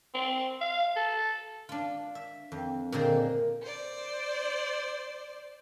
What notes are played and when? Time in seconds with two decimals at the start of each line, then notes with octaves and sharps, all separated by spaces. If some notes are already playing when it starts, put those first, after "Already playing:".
0.14 C4
0.61 F5
0.96 A4
1.69 D4 F4
2.15 E5
2.52 F2
2.92 A#2 D3 F3 C4 D#4 G#4
3.63 C5 D5